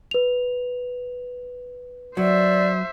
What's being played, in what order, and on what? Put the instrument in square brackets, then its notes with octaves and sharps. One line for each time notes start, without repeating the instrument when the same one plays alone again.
[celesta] B4 F7
[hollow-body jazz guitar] F#3 [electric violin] C5 E5 [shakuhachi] D5